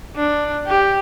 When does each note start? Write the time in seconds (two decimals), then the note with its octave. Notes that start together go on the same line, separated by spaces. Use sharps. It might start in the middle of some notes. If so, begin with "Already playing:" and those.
0.16 D4
0.67 G4